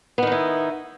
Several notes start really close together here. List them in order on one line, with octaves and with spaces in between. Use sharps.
B3 D#3 D#4 E4